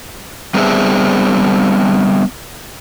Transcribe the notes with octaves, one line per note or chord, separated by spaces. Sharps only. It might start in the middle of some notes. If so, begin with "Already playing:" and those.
G3 B3 C4 D4 G#4 E5